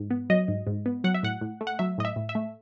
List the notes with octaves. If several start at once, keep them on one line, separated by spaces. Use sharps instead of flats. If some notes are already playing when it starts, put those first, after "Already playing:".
Already playing: G#2
B3
F#3 D#5
G#2
G#2
B3
F#3 F#5
E5
A2 F#5
A2
A3
F#5
F#3 E5
A2 D#5
E5
A2
E5
A3